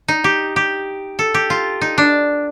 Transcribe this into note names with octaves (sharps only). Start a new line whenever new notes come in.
D#4
G4
G4
A4
G4
F4
D#4
D4